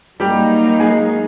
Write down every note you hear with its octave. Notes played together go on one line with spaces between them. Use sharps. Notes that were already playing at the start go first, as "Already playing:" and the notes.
F#3 G3 A#3 D#4 G4
G#3 G#4